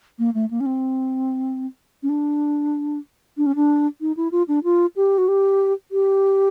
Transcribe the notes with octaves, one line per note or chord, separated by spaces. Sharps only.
A#3
A3
A#3
C#4
C4
C#4
D4
D4
C#4
D4
D#4
E4
F4
D4
F4
G4
F#4
G4
G4